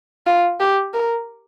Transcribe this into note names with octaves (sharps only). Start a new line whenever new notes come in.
F4
G4
A#4